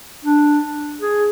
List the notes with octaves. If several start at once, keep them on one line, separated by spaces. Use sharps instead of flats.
D4
G#4